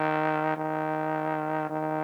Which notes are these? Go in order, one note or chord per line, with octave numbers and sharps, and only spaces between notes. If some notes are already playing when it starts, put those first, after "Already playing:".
Already playing: D#3
D#3
D#3